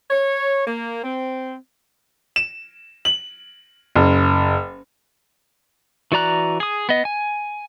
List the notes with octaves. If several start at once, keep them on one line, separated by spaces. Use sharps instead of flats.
C#5
A#3
C4
E7
F#7
F#1
E3 F#4 D5 A#5 F#6
G#4 D#6
B3 D#5
G#5